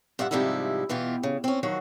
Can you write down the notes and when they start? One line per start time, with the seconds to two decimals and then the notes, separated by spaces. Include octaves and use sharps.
0.19 G2 F4 E5 F#5
0.31 G#2 C3 F3 G3 D#4 E4
0.89 B2 E3 F4 G4
1.23 C#3
1.44 C4 C#4
1.63 D#3 F3 F#3 F#4